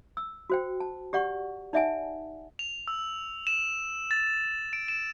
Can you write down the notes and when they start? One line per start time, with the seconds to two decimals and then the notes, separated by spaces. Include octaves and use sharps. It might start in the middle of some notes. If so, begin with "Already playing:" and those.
0.17 E6
0.50 F#4 C5 G5
0.80 A5
1.13 G4 D5 F#5 C#6
1.73 D#4 D5 E5 F#5 G#5 A5
2.59 F7
2.88 E6
3.47 E7
4.11 A6
4.73 D7
4.88 E7